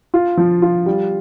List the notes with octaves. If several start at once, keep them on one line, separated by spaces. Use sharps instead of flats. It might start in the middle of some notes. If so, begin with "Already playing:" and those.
F4
F3
F4
G3